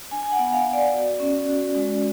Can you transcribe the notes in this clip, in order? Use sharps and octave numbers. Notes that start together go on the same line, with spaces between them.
D4 G#5
G#5
F#5
B3
F5
B3
D5
F#4
C#4
F#4
G#3